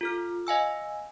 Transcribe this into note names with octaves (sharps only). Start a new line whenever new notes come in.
F4 A4 F6
D#5 F5 G#5 E6